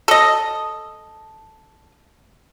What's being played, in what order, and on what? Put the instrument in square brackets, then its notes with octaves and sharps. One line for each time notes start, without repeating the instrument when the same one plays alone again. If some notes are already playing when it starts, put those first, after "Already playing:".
[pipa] A4 D#5